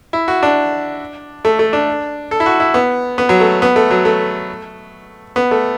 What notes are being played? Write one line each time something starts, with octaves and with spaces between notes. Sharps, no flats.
E4
F#4
D4
A3
A3
D4
A4
E4
F#4
E4
B3
B3
F#3
A3
B3
A3
F#3
A3
B3
A3